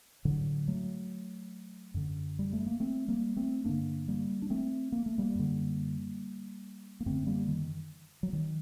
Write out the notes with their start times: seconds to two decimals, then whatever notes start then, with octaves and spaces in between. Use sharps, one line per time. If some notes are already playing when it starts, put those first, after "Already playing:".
0.25 A2 D3 F#3
0.68 F#3 A3
1.94 F#2 D3
2.39 G3
2.53 A3
2.66 A#3
2.80 A3 C4
3.08 G3 A#3
3.36 A3 C4
3.65 G2 D3 A#3 D4
4.08 G3 A#3
4.42 D4
4.50 A3 C4
4.92 A#3
5.06 A3
5.18 G3 A#3
5.35 F#2 D3
7.00 A#3
7.06 F#2 D3 A3 C4
7.26 G3 A#3
7.48 D#3
8.23 F#3
8.33 D#3